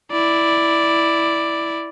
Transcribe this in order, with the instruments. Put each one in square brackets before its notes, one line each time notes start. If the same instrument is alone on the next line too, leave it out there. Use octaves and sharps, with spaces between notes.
[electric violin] E4 D5